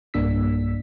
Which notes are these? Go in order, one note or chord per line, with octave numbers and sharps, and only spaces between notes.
B1 G2 A#3 D4 E6 B6